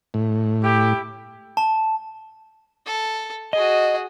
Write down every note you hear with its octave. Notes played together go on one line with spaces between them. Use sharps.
A2
E4 G4
A5
A4
F#4 G#4 D#5